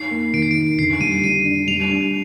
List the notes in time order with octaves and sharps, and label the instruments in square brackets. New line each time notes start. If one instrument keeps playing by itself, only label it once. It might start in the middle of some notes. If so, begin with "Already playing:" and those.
Already playing: [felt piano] D#4 [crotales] C7
[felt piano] A#3
[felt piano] D#3 [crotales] D7
[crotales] C7
[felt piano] D#4 [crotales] D7
[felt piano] D3 [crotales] C7
[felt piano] G3 [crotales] D#7
[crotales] D#7
[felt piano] D4 [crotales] D#7
[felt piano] D4
[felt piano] G3 [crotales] F7
[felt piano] D4